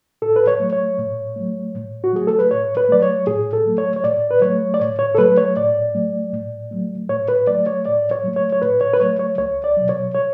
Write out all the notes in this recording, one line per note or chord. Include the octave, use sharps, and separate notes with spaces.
A2 A4
B4
C#5
F#3 A3
C#5
A2
F#3 A3
A2
F#4
F#3 A3 G#4
A4
B4
A2 C#5
B4
F#3 A3 D5
C#5
A2 G#4
A4
F#3 A3
C#5
C#5
A2 D5
B4
F#3 A3 C#5
D5
A2 C#5
C#5
A4
F#3 A3 B4
C#5
A2 D5
F#3 A3
A2
F#3 A3
A2 C#5
B4
F#3 A3 D5
C#5
A2 D5
C#5
F#3 A3
C#5
C#5
A2 B4
C#5
B4
F#3 A3 C#5
C#5
C#2 C#5
D5
B2 F#3
C#5
C#5